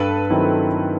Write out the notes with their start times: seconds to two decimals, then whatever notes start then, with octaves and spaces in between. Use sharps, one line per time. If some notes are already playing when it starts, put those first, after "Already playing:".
Already playing: G2 A4 B4
0.30 D#3 F#3 C4 E4